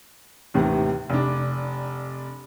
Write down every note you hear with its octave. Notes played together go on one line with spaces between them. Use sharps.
D#2 A2 C3 D#3 E3
F1 D4